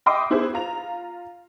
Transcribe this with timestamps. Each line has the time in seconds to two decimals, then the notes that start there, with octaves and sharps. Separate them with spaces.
0.06 D#5 E5 G5 C6 D6 D#6
0.30 B3 E4 G4 G#4 C5
0.54 F4 A#5 F7